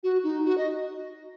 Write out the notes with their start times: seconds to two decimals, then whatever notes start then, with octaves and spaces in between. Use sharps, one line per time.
0.04 F#4
0.24 D#4
0.45 F#4
0.58 D#5